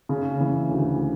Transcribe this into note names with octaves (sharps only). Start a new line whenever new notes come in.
C#3
E3
D2